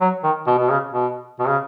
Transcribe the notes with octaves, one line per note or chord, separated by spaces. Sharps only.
F#3
D#3
B2
B2
C#3
B2
B2
C#3